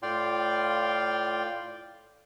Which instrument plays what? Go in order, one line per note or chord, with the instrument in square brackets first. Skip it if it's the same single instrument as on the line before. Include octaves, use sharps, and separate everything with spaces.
[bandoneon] A2 F4 D5 F5 G5 C6